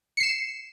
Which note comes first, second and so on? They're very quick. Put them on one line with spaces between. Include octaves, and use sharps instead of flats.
C#7 C7 E7